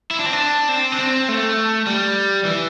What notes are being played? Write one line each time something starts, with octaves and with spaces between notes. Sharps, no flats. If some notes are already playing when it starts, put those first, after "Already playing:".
E4
D4
C4
D4
C4
D4
C4
A3
G3
E3